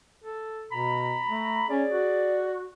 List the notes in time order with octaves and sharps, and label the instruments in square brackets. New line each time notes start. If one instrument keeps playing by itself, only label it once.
[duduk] A4
[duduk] B2 [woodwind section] A#5 B5
[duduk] A3
[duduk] C#4 [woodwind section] G#4 D5
[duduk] F#4